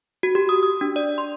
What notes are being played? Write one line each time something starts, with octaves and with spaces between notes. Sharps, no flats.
F#4
G4
D#6
D#6
D4
D5
C6